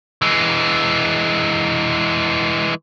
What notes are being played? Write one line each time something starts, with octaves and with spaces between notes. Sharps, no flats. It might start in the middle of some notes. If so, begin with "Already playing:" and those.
E3 G#3